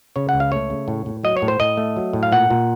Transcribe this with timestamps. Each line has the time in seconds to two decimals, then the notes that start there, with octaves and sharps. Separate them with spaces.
0.16 C#3 C#5
0.29 C#2 F#5
0.40 F5
0.52 A3 C#5
0.70 C#3
0.88 A2
1.06 A2
1.24 F#3 D#5
1.37 C#5
1.42 A2
1.48 C5
1.60 A2 D#5
1.77 A3
1.97 F#3
2.13 A2
2.23 F5
2.32 A#2 F#5
2.50 A#2